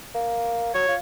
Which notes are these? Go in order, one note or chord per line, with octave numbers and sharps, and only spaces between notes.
A#3
F#3 C#5
F4